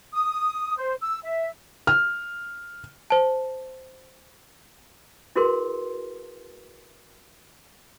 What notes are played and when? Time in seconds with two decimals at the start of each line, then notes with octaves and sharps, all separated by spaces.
0.12 D#6
0.78 C5
1.01 E6
1.24 E5
1.87 F6
3.10 C5 A5
5.36 E4 F#4 G#4 A#4 B4 C6